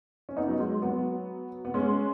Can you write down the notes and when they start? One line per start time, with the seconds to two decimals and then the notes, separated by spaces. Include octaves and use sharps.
0.29 C#4
0.37 B3 D#4
0.48 F#3
0.60 G#3
0.82 F#3 B3
1.65 B3
1.74 G#3 C#4